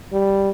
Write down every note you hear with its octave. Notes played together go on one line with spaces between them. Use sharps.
G3